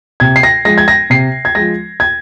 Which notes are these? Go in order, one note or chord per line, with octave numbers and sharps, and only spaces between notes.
C3 G#6
C7
A#6
F3 G#3 A#6
G#6
A#6
C3 C7
G#6
F3 G#3 A#6
G#6